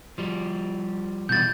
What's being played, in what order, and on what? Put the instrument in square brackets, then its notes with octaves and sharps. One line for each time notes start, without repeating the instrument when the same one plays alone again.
[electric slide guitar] F3 G3
[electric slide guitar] B2 E3 G3 [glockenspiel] G6 A6